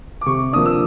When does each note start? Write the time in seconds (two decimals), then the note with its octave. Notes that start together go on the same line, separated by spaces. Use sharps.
0.21 D6
0.26 C3 C#6
0.53 F3 A#3 D4 D#6
0.66 E6